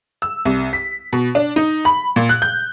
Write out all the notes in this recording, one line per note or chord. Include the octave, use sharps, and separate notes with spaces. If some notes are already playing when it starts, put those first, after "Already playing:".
E6
C2
B6
B2
D4
D#4
B5
A#2
F#6
G6